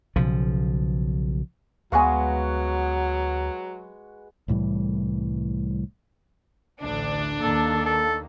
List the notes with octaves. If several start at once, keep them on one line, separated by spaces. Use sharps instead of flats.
B1 C#3 F3
D2 F#3 G#3 B3 F#4 B4 F5 G#5
C2 A2 E3 G3
A1 D2 D4
D#2 D#3 A#3 A4
A4